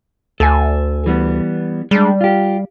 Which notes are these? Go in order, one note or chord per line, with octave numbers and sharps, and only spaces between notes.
D2 A4 G#5
E3 G3 B3
G3 G#3 D4
F4 G4